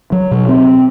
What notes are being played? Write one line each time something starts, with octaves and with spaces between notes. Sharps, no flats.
F#3
B2
C4